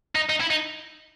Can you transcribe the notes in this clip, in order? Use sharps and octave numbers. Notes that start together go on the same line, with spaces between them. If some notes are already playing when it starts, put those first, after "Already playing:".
D#4
D#4
E4
D#4